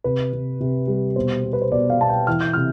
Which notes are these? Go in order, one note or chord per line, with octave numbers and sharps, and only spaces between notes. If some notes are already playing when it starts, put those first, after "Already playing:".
C3 B4
C3
C3
G3
B2 C5
B3
B4
C5
B2 D5
F5
B2 A5
G5
E3 F6
G6
C3 F6